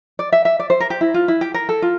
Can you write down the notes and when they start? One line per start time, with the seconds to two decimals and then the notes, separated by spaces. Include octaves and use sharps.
0.19 D5
0.32 E5
0.45 E5
0.59 D5
0.70 C5
0.80 A#4
0.90 G4
1.01 E4
1.14 F4
1.28 E4
1.41 G4
1.54 A#4
1.69 A4
1.82 F4